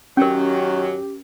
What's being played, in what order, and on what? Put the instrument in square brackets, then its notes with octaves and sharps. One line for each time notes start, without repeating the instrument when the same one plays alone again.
[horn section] F#2 D#3 F#3 [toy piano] C#4 A#4 [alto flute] G4